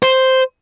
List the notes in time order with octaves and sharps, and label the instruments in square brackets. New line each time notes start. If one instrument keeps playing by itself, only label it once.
[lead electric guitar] C5